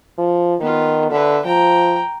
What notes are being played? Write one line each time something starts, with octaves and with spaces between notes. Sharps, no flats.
F3
D#3 B3 F4
D3 B4 E5
F3 G5 A#5